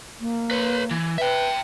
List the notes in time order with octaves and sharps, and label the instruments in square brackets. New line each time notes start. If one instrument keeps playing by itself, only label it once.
[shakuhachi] A#3
[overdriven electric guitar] B4 C#5
E3
[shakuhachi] B4 [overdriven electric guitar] E5 G5